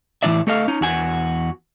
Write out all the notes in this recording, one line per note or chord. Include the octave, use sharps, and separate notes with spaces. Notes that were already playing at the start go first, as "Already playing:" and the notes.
A2 E3 A#3 D#4 D5 E5
A3 A4 D#5 F5
C#4 D#4
E2 F#4 G#5